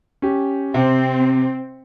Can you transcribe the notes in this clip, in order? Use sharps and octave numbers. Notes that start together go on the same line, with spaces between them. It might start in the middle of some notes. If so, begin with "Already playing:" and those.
C#4 G4
C3 C4